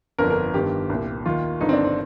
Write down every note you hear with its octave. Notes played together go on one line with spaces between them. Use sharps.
G1 F2 D3 A#4
A#4
G1 G2 D#3 G4
C2 A#2
D#2 D#3 F4
G1 G2 D3 D#4
C4
D4
C4